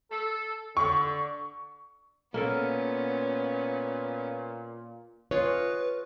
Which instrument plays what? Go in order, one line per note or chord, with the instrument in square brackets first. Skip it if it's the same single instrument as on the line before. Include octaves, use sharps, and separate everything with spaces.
[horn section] A4
[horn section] D3 [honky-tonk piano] C#6
[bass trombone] A#2 [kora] A#3 A4 A#4 [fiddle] B3 C#4
[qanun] F4 G#4 D#5 [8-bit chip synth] B4 [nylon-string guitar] C#5